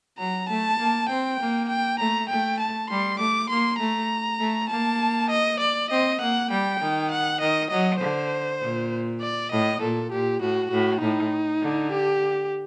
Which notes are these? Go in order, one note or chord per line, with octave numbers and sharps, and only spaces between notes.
F#3 A#5
A3 A5
A#3
C4 G5
A#3
G5
A3 A#5
A3 G5
A5
G3 C6
A3 D6
A#3 C6
A3 A#5
A3
A#3 A5
D#5
D5
C4 D#5
A#3 F#5
G3 G5
D#3
F#5
D#3 D#5
F#3 D#5
D3 C5
A#2
D5
A2 D#5
A#2 A4
A#2 G4
A2 F#4
A2 F#4
A2 D#4
D3
G4